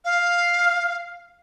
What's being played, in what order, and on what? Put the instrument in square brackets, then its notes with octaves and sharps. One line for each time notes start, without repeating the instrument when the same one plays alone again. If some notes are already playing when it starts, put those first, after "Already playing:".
[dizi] F5